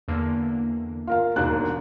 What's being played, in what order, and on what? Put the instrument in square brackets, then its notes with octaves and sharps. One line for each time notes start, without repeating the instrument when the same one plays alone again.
[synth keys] E2 D3 A#3
[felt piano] F4 A#4 F5
[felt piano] E1 D#2 F#6 [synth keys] D4